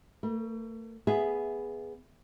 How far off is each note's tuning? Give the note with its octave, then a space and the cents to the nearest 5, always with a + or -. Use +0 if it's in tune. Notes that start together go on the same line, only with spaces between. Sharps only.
A3 +40 B4 -45
B3 +0 G#4 +0 E5 +10